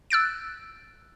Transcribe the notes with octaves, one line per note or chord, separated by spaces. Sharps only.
E6 F#6 A6 D7